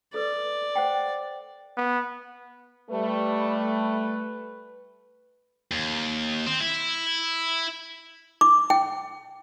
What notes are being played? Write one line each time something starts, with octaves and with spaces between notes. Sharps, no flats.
A4 B4 D5
C5 F#5 G5
B3
G3 A3 B4
D#2
C4
E4
D6
G5